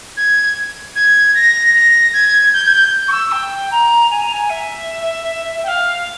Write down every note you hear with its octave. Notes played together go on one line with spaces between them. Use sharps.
G#6
G#6
A#6
A#6
G#6
G6
G#6
G6
C#6
E6
G5
A#5
G#5
A#5
G#5
E5
G5
F5